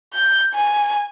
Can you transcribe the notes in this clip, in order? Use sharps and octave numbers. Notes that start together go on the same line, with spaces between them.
G6
G#5